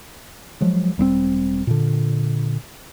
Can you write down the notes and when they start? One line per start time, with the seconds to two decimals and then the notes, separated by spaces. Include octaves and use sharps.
0.61 F3 F#3 G#3
0.98 E1 G3 A#3 C4
1.67 A#2 D3